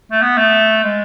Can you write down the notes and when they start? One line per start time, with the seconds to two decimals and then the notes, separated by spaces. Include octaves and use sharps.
0.12 A3
0.22 B3
0.38 A3
0.84 G#3